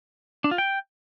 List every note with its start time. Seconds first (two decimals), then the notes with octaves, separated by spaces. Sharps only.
0.44 D4
0.51 F4
0.58 G5